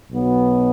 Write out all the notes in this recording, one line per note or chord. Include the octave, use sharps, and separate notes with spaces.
B1 B2 F#3 B3